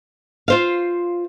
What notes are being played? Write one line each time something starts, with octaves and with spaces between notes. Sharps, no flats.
F4 C5 F5